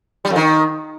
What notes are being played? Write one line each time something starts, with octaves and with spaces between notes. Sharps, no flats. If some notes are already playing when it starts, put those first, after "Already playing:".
G3
F2
D#3